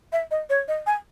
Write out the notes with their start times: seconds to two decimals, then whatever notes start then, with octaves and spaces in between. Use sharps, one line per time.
0.13 E5
0.31 D#5
0.50 C#5
0.68 D#5
0.87 G#5